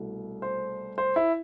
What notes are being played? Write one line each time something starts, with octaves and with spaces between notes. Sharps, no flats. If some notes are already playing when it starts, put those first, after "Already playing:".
Already playing: C2 B2 A3
C5
C5
E4